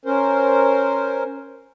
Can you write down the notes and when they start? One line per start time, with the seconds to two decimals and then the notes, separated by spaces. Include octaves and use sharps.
0.06 C#4 A#4 C5